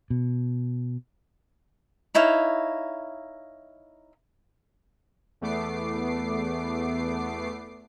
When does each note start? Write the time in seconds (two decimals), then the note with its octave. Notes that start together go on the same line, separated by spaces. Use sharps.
0.10 B2
2.15 D#4 E4 C#5 F5
5.41 E2 A3 B3 D6 C7